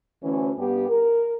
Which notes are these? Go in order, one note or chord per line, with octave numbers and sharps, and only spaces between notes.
D2 E3 C#4
G2 B3 G4
A#4